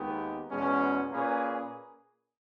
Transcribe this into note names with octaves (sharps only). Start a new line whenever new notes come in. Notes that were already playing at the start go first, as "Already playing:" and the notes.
Already playing: D#2 D#3 G#3 B3 G4
E2 B2 G#3 C#4
A#2 A#3 C#4 G#4 B4